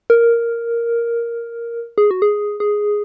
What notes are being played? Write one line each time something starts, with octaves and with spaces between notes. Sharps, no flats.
A#4
G#4
F#4
G#4
G#4